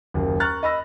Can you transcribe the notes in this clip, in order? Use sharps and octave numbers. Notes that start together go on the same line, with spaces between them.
F#1 D#2
A#5 C#6 F6 F#6 A6
D#5 B5 E6 A#6